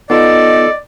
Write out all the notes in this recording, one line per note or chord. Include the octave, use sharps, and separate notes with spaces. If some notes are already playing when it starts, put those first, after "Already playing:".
B3 D#4 F4 A4 D5 D#5